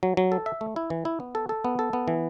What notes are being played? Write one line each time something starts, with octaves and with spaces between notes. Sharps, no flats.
F#3
F#3
A4
E5
A3
E4
E3
E4
B3
A4
A4
B3
A4
B3
E3